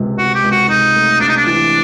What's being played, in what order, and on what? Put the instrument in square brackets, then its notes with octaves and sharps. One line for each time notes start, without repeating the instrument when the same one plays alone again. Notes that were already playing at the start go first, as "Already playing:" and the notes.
Already playing: [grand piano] C#2 C3
[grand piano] C3 [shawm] F#4
[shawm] G4
[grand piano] C#2
[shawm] F#4
[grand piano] C3 [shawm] D#4
[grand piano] A3
[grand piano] C3 [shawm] D4
[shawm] D#4
D4
[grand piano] E3